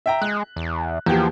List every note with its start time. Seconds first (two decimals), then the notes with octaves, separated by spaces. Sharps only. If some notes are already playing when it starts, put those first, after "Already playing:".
0.06 E5 G5 A#5
0.22 G#3 F#6
0.56 E2
1.06 E2 F3 A#3 G4